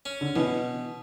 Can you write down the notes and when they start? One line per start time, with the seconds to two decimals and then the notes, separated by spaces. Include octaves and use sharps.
0.06 C#4
0.21 D3
0.36 B2 E3